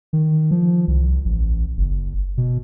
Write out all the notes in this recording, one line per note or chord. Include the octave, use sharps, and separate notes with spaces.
D#3
F3
C2
A1
F#1
B2